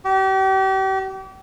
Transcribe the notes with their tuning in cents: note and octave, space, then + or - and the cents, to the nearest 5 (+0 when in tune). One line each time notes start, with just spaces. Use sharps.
G4 -35